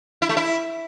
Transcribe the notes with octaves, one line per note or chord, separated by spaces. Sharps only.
E4
A3
E4